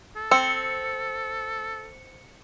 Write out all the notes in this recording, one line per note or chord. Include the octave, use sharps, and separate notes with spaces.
A4
C4 E6 C#7